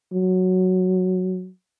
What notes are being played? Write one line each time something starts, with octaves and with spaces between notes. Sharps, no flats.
F#3